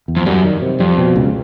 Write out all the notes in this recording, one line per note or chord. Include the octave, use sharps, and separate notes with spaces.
E2
F2
F#2 G3
D#3
C3
F2 G3
B2
C#2